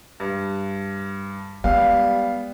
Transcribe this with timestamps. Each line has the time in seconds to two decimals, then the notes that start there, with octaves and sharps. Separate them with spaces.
0.20 G2
1.64 G3 G#3 B3 F5